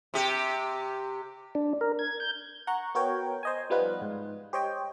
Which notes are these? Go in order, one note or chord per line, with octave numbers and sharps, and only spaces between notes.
C3 G4
D4
A#4
G#6
G6
F#5 A#5 C#6
B3 F#4 A#4 C#5 G5
C5 D#5 G#5
F3 G3 B3 D#4 F4 B4
G#2
G4 C5 C#5 D#5 G5